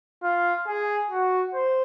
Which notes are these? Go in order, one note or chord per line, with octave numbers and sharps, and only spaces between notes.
F4
G#4
F#4
C5